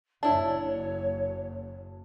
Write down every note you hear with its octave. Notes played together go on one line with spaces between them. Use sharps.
F#1 F#2 D4 E4 C#5 A5